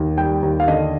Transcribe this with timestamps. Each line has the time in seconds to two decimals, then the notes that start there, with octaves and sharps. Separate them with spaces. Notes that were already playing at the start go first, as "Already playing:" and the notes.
Already playing: D#2
0.18 G3 G5
0.43 D#2
0.60 F5
0.68 D3 D#5